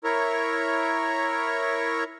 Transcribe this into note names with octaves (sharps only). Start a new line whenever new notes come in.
E4 A#4 C#5